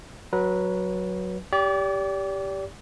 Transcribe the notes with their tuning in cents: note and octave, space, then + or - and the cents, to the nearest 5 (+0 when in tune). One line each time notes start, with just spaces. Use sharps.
F#3 +0 B4 -20
G4 +0 D5 -35